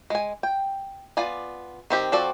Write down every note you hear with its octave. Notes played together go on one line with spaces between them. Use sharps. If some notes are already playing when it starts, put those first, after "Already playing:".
G#3 G#5
G5
B3 F4 D5 G#5
D#3 C4 G4
F3 C4 F#4 A4 D5